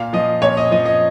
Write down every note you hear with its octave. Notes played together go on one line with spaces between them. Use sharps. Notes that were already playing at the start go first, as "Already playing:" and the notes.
Already playing: A#2 F5
F3 D#5
A#2 C#5
D#5
F3 D#5
D#5